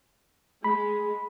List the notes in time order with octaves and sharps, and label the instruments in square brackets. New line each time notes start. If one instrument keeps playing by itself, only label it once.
[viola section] G#3 [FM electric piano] B5